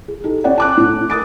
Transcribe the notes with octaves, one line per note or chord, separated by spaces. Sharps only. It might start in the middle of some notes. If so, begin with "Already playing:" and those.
G#4
D#4 G4 A4
C#4 C#5 D5 F#5 G5
A5 D6 F#6
A2 D4 E4
A#4 D#6 A6 D7